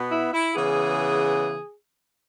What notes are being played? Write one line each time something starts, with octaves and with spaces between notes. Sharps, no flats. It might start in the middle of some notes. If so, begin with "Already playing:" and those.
Already playing: B2 B3
E4
E4
C#3 E3 B3 G#4